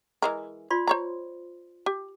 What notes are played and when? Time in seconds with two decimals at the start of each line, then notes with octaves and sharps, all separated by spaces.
0.22 E3 G#3 A#4
0.70 F4 D5 C6
0.87 C5 C#5 A#5
1.86 G4